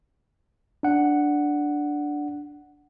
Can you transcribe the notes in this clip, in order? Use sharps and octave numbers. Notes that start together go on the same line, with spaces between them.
D4 F#5